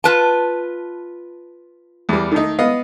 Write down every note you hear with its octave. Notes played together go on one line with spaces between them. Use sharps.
F4 B4 A5
E2 G3
D#3 A3 D#4
B3 D#5 F5